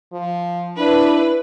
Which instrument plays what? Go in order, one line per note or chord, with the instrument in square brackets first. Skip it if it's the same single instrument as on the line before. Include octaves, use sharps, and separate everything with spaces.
[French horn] F3
[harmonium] D4 [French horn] E4 [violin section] B4